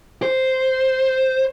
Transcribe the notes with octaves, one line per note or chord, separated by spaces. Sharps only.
C5